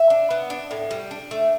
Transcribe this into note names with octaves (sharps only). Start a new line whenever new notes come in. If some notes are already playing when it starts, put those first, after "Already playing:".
Already playing: E5
D4
B3
D4
A2
G3
D4
A3